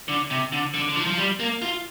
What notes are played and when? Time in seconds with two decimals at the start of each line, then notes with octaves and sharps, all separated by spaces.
0.08 D3
0.30 C3
0.52 D3
0.74 D3
0.89 D3
0.96 F3
1.07 F3
1.17 G3
1.39 A#3
1.62 F4